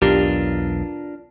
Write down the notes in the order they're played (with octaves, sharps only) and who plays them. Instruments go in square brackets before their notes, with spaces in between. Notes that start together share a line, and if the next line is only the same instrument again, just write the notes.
[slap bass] B1 E2 [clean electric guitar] D4 F4 A#4 [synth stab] G4